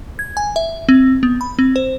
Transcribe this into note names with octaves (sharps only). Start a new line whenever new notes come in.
G#6
G#5
E5
C4
B3
B5
C4
C5